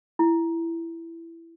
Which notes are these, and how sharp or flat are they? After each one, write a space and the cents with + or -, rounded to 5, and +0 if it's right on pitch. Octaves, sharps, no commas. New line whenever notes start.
E4 +15